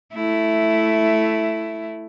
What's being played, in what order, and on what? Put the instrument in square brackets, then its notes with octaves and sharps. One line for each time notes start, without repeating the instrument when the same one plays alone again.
[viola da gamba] A3 E4